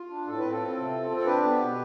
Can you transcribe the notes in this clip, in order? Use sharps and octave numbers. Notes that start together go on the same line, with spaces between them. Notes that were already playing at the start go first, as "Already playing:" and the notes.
Already playing: F4
D4
A2 A4
C4 B4
F4 A4
C4
C3
C4
C4
A4
D4 G4 B4
B3
B2